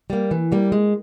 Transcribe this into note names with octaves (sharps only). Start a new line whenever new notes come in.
G3 A#3
E3
G3 A#3
G#3